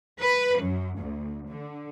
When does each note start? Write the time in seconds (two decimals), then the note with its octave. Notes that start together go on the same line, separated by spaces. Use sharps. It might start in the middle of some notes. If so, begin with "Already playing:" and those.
0.21 B4
0.61 F#2
0.99 D2
1.49 D3